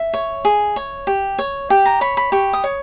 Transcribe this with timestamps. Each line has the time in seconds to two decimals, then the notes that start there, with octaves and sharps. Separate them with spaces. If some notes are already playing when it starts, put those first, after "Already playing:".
Already playing: E5
0.13 C#5
0.45 G#4
0.76 C#5
1.07 G4
1.39 C#5
1.70 G4 G5
1.85 A#5
2.01 C#5 B5
2.17 B5
2.32 G4 C#6
2.53 D#6
2.64 C#5